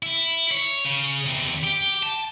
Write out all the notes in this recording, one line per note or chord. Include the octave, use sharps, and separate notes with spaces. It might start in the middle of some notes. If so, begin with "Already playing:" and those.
E4
C#5
C#3
E2 C3
G4
A5